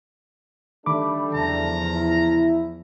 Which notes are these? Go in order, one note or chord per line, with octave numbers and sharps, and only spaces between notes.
D#3 G3 A3 D4 B5 D6
E2 C#3 F3 A5 A#5
E4